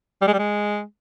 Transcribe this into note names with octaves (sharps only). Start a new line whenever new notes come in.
G3
G#3
G3
G#3